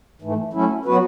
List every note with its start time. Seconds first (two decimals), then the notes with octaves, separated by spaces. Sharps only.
0.22 G#2 E3 A3
0.53 F#3 A3 C#4 E4
0.85 F#3 B3 F#4 B4